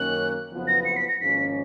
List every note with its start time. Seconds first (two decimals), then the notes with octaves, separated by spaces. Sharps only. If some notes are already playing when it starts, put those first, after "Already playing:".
Already playing: F#2 D#3 A#3 C#4 F#6
0.50 F#1 F2 F3 B3
0.67 A#6
0.85 C#7
0.96 B6
1.08 A#6
1.20 G#1 G#2 F3 A#3 C#4 B6